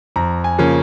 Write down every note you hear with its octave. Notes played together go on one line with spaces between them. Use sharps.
F2 A#5
G#5
C#3 F3 A#3 C#4